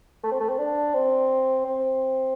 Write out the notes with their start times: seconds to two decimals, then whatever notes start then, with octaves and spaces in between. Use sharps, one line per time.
0.23 A3
0.31 C4
0.40 A3
0.49 C4
0.59 D4
0.94 C4
1.65 C4